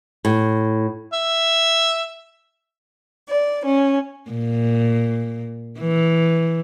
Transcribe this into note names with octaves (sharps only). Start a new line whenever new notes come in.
A2
E5
D5
C#4
A#2
E3